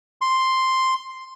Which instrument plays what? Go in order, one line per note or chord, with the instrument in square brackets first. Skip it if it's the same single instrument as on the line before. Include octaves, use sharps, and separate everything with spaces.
[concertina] C6